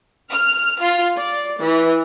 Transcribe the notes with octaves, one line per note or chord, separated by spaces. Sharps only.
F6
F4
D5
E3